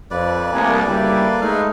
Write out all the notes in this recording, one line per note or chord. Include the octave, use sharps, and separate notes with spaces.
F2 B4 D5
C2 A3 A#3 G#5
D2 C#3 G3 A#3 E4 A4
G#3 A3 D#4 E4 B4 F5